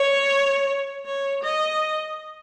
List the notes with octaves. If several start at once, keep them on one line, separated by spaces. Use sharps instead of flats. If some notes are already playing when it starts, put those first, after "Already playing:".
Already playing: C#5
C#5
D#5